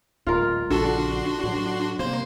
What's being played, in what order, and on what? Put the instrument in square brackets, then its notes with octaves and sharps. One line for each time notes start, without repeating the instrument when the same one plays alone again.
[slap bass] D1 G#3 [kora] F4 A#4
[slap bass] A#1 C#3 [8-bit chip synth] D4 F#4 C6 [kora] A4
[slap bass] A2 F#3
[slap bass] G2 C3 [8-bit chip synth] A#3 C5 C6